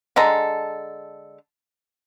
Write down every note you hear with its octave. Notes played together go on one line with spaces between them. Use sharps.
D3 G#3 A4 A#5